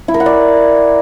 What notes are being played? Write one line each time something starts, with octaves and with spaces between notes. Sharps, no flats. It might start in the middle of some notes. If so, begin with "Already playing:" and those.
E4
A#4
F#5
D5